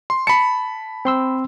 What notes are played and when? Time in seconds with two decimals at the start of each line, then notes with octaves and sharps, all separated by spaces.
0.10 C6
0.27 A5 B5 C#7
1.05 C4 C6 E6